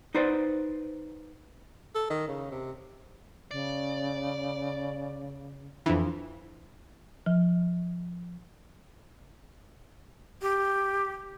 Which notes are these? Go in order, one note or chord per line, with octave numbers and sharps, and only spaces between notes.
D#4 B4 C5 D5
A4
D#3
C#3
C3
C#3 D5
F2 E3 F3 D4
F3
G4